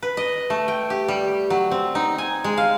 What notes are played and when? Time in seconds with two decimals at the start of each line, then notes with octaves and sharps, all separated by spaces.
0.02 B4
0.17 D#5
0.50 A3
0.68 G5
0.90 G4
1.08 G3
1.50 F#3
1.71 C4
1.95 D#4
2.18 G#5
2.44 G#3
2.57 F5